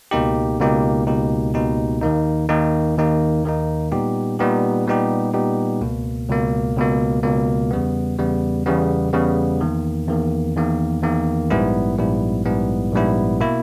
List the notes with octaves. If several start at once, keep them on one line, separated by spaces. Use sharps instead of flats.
C#2 B2 A#3 D#4 G4
C#2 B2 A#3 D#4 G4
C#2 B2 A#3 D#4 G4
C#2 B2 A#3 D#4 G4
D#2 D#3 A#3 D#4
D#2 D#3 A#3 D#4
D#2 D#3 A#3 D#4
D#2 D#3 A#3 D#4
A#2 G3 B3 D#4 G4
A#2 G3 B3 D#4 G4
A#2 G3 B3 D#4 G4
A#2 G3 B3 D#4 G4
C#2 B2 A#3
C#2 B2 A#3
C#2 B2 A#3
C#2 B2 A#3
E2 C#3 G3 B3
E2 C#3 G3 B3
E2 C#3 G3 B3
E2 C#3 G3 B3
E2 D#3 A#3
E2 D#3 A#3
E2 D#3 A#3
E2 D#3 A#3
A#1 G#2 G3 B3 E4
A#1 G#2 G3 B3 E4
A#1 G#2 G3 B3 E4
A#1 G#2 G3 B3 E4
B2 A#3 E4